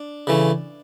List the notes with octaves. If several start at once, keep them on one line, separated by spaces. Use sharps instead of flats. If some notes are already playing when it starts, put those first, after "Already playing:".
Already playing: D4
C#3 E3 A3